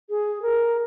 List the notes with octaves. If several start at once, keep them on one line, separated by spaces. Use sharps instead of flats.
G#4
A#4